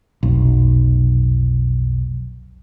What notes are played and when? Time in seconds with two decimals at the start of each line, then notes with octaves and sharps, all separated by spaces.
0.23 F1 B1